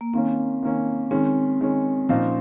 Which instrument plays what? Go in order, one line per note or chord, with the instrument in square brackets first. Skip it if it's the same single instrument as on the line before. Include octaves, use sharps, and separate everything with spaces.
[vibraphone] A#3
[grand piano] D#3 A#3 C#4 [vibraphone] C4
[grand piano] D#3 A#3 C#4
[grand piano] D#3 G#3 C#4 [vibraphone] C4
[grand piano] D#3 G#3 C#4
[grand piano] A#2 F3 C4 D#4 [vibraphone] C#4